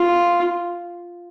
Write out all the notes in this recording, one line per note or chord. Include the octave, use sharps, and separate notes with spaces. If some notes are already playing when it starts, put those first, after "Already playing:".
Already playing: F4